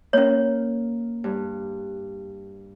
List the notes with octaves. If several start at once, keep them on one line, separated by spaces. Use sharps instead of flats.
A#3 C#4 C#5
G2